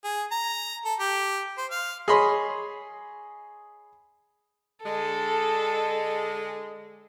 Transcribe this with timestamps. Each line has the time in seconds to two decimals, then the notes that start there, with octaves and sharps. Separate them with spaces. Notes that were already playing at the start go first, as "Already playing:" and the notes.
0.04 G#4
0.31 A#5
0.85 A4
1.00 G4
1.58 C5
1.71 F5
2.08 G#4 C#5 D#5 B5 C6
4.84 D3 G#3 A4